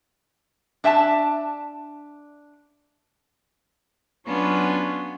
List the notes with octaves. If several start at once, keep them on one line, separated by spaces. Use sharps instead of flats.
D4 E5 G5 A5
F#3 B3 C#4 D4 F4